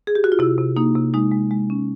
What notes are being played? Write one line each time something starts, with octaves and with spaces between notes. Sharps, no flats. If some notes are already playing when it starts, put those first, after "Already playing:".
G#4
G4
F#4
F4
C3 E4
C3
A#3 D#4
C3
G#3 D#4
G#3
G#3
C#4